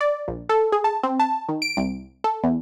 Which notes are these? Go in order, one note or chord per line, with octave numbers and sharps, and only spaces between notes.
D5
A#1
A4
G#4
A5
C4
A5
D#3
D7
C2
A4
E2